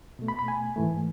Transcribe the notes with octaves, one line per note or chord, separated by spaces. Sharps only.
B2 A3
B5
B5
G#5
G#2 E3 A3